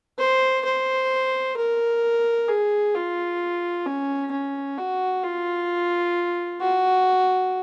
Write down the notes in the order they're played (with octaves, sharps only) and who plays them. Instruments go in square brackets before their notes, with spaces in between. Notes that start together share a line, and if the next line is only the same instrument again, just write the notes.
[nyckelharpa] C5
C5
A#4
G#4
F4
C#4
C#4
F#4
F4
F#4